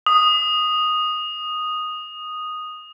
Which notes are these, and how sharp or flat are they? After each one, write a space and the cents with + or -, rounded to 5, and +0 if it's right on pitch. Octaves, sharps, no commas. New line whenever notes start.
D#6 -5